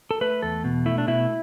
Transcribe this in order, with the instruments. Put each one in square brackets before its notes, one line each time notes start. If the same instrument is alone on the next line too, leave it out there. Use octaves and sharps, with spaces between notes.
[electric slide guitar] A4
A3 B4
E2 A4
B2
A3 E4
D4
B2 E4